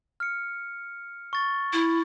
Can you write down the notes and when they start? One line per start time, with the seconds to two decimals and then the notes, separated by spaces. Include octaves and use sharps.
0.20 F6 C#7
1.33 C#6 A6 G7
1.73 E4